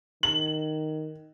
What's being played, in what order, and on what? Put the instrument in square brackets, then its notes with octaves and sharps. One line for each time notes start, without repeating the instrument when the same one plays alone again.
[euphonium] D#3 [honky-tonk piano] F#7